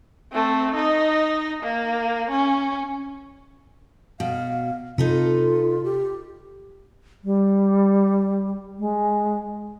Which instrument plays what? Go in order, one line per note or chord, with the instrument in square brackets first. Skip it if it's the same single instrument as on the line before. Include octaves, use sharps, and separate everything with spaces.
[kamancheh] A3 C4
D#4 D#5
A#3
C#4
[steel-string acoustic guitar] B2 F#4 [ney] F5
[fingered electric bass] C3 [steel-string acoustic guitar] D#4 A4 B4 [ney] F4
[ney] G4
[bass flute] G3
G#3